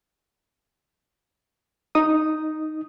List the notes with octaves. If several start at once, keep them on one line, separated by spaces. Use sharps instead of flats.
D#4 D#6